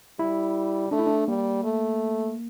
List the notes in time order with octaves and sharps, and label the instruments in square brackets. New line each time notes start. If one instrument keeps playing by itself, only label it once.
[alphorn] G3 [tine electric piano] E4
[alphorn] A3 [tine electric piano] D4
[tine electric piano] E4
D4
[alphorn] G3 [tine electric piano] A#3
[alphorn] A3